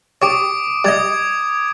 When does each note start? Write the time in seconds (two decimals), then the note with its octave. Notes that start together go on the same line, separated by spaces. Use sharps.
0.22 G4 C#5 D6 D#6 D7
0.85 G3 D#5 D#6 G#6